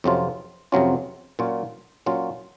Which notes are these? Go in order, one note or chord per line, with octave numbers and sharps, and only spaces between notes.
F2 C3 F#3 C#4 F4
F2 C3 F#3 C#4 F4
A#2 F#3 C#4 F4
A#2 F#3 C#4 F4